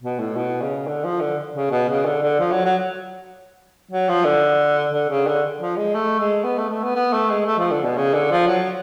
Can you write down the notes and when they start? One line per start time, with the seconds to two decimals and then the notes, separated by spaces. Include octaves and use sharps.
0.03 B2
0.19 A2
0.36 B2
0.61 C#3
0.87 D3
1.04 F3
1.20 D3
1.55 C#3
1.71 B2
1.89 C#3
2.05 D3
2.23 D3
2.39 F3
2.52 F#3
2.65 F#3
3.91 F#3
4.09 F3
4.25 D3
4.92 D3
5.09 C#3
5.27 D3
5.60 F3
5.77 G#3
5.95 A3
6.19 G#3
6.44 B3
6.58 A3
6.70 A3
6.83 B3
6.95 B3
7.13 A3
7.30 G#3
7.46 A3
7.59 F3
7.71 D3
7.84 B2
7.97 C#3
8.14 D3
8.31 F3
8.47 F#3